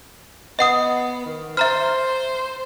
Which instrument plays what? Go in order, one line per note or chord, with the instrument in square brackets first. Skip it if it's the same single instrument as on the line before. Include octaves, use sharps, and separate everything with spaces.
[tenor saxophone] B3 [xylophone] D#5 F#5 D#6
[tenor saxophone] D#3
[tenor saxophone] C5 [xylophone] E5 A#5 F6